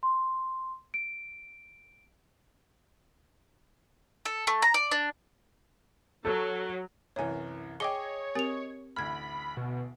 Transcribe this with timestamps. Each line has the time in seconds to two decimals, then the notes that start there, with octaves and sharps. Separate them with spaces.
0.03 C6
0.94 D7
4.25 A4
4.47 A3
4.62 A#5
4.74 D5
4.91 D4
6.25 F#3 A4
7.16 C2 F#2 E3 C#5 G#5
7.80 G#4 C#5 D#5 G5 D6 G7
8.35 C4 G4 A#4 D#6 F7
8.96 A1 D2 B5 F6 G#6
9.57 B2